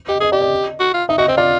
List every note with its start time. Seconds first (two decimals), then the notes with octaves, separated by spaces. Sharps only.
0.08 G4 D#5
0.20 G#4 D#5
0.32 G4 D5
0.42 D#5
0.80 F#4
0.94 F4
1.09 D#4 E5
1.18 F#4 D#5
1.28 C4 D#5
1.37 F4 D5